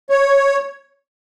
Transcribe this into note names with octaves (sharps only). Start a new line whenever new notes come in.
C#5